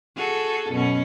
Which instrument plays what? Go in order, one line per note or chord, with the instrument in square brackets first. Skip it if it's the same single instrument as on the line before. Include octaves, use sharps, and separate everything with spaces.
[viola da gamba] F#4 G#4 A4
F#2 B2 C#4